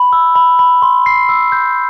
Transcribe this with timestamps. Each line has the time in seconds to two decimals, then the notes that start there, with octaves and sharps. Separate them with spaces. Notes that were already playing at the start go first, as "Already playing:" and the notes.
Already playing: B5
0.13 E6
0.35 B5
0.59 B5
0.82 C6
1.06 C7
1.29 E6
1.52 G6